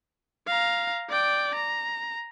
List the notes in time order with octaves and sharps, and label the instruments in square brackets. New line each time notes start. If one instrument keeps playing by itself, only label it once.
[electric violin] F5 A#5
D5 G5
A#5